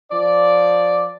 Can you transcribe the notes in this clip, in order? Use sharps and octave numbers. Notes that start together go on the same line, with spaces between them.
F3 D5